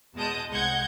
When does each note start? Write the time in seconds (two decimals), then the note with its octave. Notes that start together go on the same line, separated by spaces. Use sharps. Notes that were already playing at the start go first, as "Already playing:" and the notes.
0.14 E2 B2 G#3 A5 D#6 G6
0.50 C2 G#3 F#5 G6 G#6